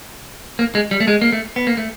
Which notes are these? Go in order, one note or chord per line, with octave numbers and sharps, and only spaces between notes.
A#3
G#3
G3
A3
G#3
A#3
A3
B3
A#3
A3